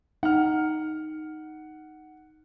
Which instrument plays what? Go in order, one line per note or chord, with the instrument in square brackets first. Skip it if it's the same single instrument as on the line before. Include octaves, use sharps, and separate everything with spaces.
[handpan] D#4 [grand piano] F#5 F6